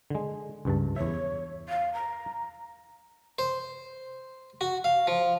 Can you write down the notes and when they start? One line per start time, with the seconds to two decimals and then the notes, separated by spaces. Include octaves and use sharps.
0.10 D3 G#3
0.65 C#2 G2 A5
0.96 E2 C#5 E5
1.69 F5
1.93 A#5
3.39 C5
4.61 F#4
4.84 F5
5.07 F3